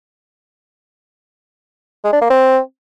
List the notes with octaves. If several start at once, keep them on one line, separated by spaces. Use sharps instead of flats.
G#3
D4
A#3
C4